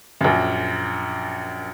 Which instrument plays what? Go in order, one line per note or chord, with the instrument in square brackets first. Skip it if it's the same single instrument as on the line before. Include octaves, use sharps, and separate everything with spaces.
[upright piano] A#1 F#2